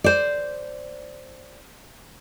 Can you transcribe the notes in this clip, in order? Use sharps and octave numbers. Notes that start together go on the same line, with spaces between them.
C5 D5